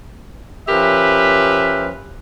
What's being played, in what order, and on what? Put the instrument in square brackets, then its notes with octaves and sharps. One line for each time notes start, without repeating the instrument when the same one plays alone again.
[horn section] F3 C#4 G4 A#4 B4 E5